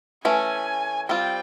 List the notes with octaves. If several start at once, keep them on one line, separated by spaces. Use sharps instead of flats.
E3 A3 C#4 G#5
G3 C4 F4 G5